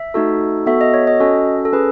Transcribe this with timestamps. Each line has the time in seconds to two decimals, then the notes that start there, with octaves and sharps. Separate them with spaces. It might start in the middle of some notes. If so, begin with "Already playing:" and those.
Already playing: E5
0.14 A3 D#4 F#4 A4
0.66 B3 F#4 A4 E5
0.81 D#5
0.94 C#5
1.07 D#5
1.20 C#4 F#4 A4
1.65 A4
1.73 C#4 G#4 B4